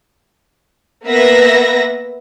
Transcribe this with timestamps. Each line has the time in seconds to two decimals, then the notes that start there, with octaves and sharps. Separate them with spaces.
1.06 A#3 B3 B4 E5 A#6